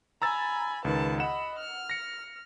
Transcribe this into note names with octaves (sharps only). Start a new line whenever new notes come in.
G#5 A#5 B5 E6 A6
C#2 D#3 B4 A5
D#5 F#5 B5 E7
F6
A#6 C#7